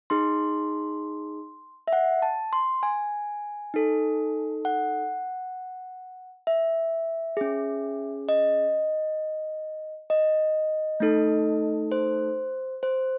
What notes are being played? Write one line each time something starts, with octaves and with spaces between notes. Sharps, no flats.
D#4 G#4 C6
E5
F#5
A5
C6
G#5
D#4 A4
F#5
E5
C#4 G#4
D#5
D#5
A3 D#4 A4
C5
C5